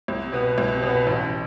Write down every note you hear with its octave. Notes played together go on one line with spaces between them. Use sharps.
C2
B2 B3
C2
B2 B3
A1